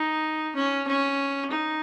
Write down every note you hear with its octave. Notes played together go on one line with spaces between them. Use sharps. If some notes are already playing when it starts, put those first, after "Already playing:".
Already playing: D#4
C#4
C#4
D#4